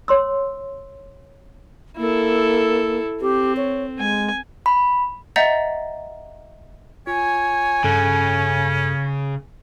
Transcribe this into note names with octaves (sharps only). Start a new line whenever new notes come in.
C#5 C6 E6
A#3 E4 A4
C4 G4
C#5
G#3 G#5
B5
D#5 E5 F#5 A#5 G6 A6
F4 C#5 G#5
G2 C#3 C#4 A4 F#6